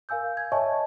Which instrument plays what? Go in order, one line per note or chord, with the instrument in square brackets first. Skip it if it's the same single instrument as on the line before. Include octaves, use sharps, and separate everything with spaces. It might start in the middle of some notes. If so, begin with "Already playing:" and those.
[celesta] A#4 F5 G#5 E6 G6
G#6
C#5 D#5 E5 G#5 A5 C#6